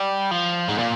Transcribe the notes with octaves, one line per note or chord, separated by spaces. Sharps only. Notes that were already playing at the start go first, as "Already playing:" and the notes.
Already playing: G3
F3
G#2
A#2